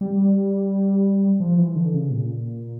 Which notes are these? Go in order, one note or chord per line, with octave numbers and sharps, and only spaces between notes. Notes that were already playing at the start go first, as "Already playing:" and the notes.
G3
F3
E3
D3
C#3
A#2